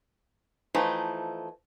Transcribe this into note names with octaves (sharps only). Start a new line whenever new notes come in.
E3 F3 A3 D#4